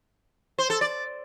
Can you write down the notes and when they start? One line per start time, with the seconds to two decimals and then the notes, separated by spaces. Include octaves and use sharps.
0.59 C5
0.70 A4
0.81 D5